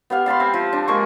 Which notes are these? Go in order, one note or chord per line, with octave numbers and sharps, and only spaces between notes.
B3 G4 F5
F5 A5 B5 C6
C4 E5
F3
D4
G#3 A#3 C#6